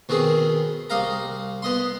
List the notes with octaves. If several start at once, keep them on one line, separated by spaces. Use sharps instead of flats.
B2 D#3 C4 G#4
C2 D#5 F5 A#5
B3 D#5 C6